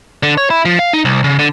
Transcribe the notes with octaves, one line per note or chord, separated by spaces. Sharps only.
D3
C#5
E4
F3
F5
D#4
C2
C#3
D3